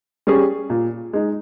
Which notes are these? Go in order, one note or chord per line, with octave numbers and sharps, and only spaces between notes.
G3 C#4 G#4
A#2
G#3 D#4